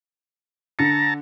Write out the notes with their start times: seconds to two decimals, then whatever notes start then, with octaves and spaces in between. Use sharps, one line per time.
0.79 D3 A5 A#5 C#7